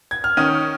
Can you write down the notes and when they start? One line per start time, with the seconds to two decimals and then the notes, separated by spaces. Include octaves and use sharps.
0.11 G#6
0.24 F6
0.37 D#3 C#4 D#6